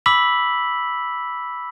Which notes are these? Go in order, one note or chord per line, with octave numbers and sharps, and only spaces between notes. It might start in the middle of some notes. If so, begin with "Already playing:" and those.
B5 D6 E6 B6 F#7